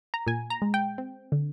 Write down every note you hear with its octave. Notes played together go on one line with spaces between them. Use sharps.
A#5
A#2 G#5
A#5
G#3
G5
C4
D3